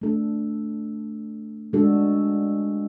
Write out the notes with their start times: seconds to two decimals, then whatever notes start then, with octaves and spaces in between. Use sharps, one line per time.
0.02 A3 D4 A4
1.73 G#3 D4 F#4 A4